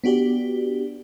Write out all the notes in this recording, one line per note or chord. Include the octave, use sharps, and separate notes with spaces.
B3 D4 F#4 G4 D5